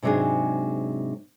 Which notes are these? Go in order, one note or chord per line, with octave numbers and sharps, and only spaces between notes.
G#2 C3 F#3 D4 D#4 G#4